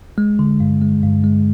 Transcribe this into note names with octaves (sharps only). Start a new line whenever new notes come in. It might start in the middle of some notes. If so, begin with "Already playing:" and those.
G#3
D3
G2
G#3
G2
G#3